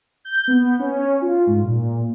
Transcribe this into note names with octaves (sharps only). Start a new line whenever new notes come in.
G6
B3
C#4
F4
G#2
A#2